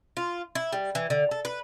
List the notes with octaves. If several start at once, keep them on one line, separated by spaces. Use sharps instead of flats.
F4
E4
G3
E3
D3
A4
B4